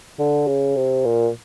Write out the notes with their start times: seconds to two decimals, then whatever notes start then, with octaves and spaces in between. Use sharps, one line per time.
0.19 D3
0.47 C#3
0.76 C3
1.05 A#2